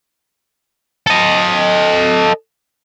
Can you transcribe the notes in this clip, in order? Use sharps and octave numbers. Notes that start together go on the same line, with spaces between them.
A4 D#5